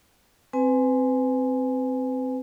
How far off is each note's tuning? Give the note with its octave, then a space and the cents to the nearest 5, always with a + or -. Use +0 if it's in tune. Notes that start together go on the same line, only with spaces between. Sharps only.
C4 +0 B4 +30 G#5 +0